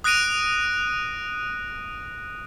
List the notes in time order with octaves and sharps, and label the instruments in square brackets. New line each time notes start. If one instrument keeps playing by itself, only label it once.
[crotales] D#6 F#6 A#6 D7 D#7 F7